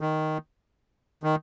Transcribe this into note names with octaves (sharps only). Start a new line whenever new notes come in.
D#3
D#3